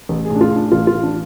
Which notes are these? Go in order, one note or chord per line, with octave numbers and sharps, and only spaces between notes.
A1
G#4
A2
D4
F4
A2
D4
A1 F4
F4
A1
D4